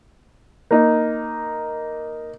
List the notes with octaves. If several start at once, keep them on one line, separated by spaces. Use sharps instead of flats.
A#3 D#4